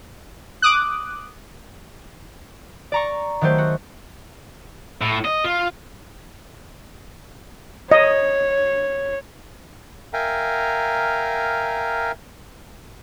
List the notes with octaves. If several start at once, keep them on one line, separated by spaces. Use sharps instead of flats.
D6 D#6 F#6
D5 A#5 C#6
D#3 F#3 A3 G4 C5
F#4
A2
D#5
F4
C#5 D#5
A#4 E5 F5 G5 G#5 A#5